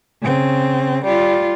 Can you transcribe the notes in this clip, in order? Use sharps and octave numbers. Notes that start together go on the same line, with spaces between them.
C#3 C4
G3 F4